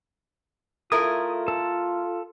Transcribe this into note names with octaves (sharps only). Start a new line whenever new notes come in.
A3 E4 F4 A#4 D#6
A4